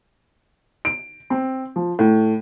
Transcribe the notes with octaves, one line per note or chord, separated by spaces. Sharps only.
D7
C4
F3
A2